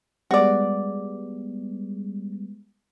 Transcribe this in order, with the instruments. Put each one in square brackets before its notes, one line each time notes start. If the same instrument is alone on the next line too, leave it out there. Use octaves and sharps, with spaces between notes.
[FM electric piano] G3 G#3 B3 [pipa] F#4 D5